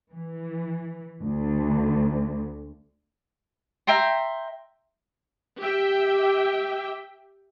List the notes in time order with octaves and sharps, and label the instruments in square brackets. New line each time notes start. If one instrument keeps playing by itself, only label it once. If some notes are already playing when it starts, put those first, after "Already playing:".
[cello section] E3
D2
[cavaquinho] E5 G5 A#5 C6
[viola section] G4 E5 G5